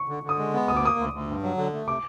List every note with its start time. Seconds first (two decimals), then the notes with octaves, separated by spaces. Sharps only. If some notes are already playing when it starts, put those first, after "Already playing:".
Already playing: C#6
0.09 D3
0.23 D3
0.29 D#6
0.38 G#3
0.54 B3
0.68 D2 D#6
0.76 D6
0.83 A#3 D#6
0.98 D2
1.13 D2
1.27 G2
1.43 F#3
1.57 D3
1.73 A3
1.87 C3 D6